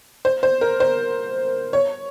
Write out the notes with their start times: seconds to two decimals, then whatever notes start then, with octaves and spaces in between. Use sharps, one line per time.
0.25 C5
0.43 C5
0.61 A#4
0.80 C5
1.73 C#5